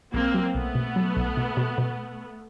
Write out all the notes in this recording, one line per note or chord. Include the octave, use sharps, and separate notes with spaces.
B1 A#3 C4
F#3
B1 A3 B3
B2
F#3
B1
B2
B2
B2